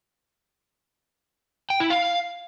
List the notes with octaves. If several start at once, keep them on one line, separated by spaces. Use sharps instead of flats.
G5
E4
F5